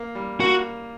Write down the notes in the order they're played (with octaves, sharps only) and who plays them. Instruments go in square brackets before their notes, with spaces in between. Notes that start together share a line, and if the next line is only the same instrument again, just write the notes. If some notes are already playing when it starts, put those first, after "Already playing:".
Already playing: [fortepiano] A#3
G3
[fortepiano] A#3 [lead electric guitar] F#4